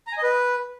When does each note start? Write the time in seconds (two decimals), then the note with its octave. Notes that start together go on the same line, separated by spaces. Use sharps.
0.07 A#5
0.12 G#5
0.18 D#5
0.23 B4